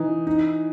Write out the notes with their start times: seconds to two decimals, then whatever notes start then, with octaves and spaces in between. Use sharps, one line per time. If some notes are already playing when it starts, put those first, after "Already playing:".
Already playing: E3 D#4
0.27 D#4